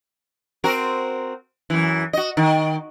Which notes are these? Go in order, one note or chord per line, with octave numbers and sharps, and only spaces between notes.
C4 F#4 A#4
F#2 E3
F#4 D#5
D#3